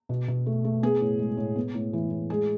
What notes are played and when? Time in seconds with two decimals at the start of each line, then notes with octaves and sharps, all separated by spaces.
0.09 B2
0.28 B2
0.46 A3
0.65 A3
0.83 B3 G#4
1.01 A2
1.19 G#3
1.37 A2
1.56 B3
1.75 A2
1.93 E3
2.11 A2
2.30 G#3 G#4